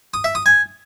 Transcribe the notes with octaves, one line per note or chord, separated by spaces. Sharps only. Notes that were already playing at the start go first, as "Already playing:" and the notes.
D#6
E5
D#6
G#5